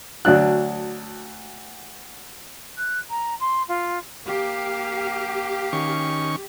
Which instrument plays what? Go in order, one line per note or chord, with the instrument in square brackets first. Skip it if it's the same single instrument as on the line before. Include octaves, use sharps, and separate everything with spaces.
[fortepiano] D2 F#3 D4 F#6
[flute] F#6
A#5
C6
F4
[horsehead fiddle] A#3 F5 [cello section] G4
[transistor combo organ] D#3 C#4 C#6